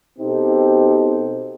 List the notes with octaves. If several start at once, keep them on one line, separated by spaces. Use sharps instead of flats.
B2 C4 D#4 G4 A4